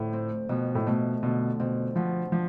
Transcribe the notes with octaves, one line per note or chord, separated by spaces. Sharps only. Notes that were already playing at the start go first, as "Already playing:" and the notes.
Already playing: F2 A2 D3 A3
C4
F2 B2
A2
B2 A3
B2 D3
B2 C4
B2 F3
F3 D4